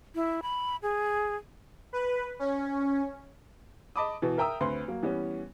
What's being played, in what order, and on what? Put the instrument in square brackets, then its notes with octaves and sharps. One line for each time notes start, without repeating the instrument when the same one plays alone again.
[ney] E4
B5
G#4
[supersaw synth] B4
C#4
[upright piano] D#5 A5 B5 D6 D#6
B2 E3
A#4 E5 G5 A#5 D#6 E6
D2 C4 B4 C6
F#3 A#3
E3 G3 B3 C#4